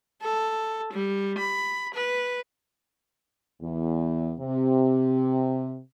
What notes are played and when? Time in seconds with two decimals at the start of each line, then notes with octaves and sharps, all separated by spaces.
0.22 A4
0.93 G3
1.38 B5
1.94 B4
3.62 E2
4.40 C3